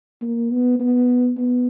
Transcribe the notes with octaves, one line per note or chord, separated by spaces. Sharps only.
A#3
B3
B3
B3